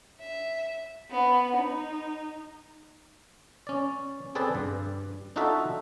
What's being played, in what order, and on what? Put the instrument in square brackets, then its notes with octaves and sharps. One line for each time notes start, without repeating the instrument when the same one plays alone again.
[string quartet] E5
B3
D#4
[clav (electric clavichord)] C#4 D5
C4 G#4 A4 B4 D5 A5
G2
D4 D#4 F4 F#4 A4 E5